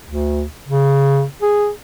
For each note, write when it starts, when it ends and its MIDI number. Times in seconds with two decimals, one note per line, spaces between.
0.07 0.44 38
0.68 1.25 49
1.42 1.70 68